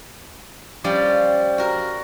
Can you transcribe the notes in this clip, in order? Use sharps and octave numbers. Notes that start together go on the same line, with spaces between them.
F3 G3 C#4 G4 D5
F#4 A#4